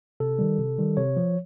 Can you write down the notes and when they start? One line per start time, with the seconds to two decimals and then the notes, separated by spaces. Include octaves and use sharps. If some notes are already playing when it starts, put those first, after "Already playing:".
0.20 C3 A4
0.39 D#3 G3
0.58 C3
0.78 D#3 G3
0.97 C3 C#5
1.17 F3